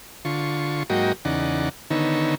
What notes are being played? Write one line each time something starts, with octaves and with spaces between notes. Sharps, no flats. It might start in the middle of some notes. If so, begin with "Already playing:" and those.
D3 F4 C#6
G#2 F#3 A#3 F#4 D#5 G5
E2 C#3 D#4 D5 F#5
D3 D#3 B3 D#4 C#5 E6